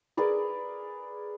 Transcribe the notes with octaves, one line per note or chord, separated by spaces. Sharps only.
G#4 A#4 B4 D5